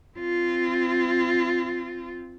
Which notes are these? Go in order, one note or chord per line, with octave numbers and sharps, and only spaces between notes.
C4 F4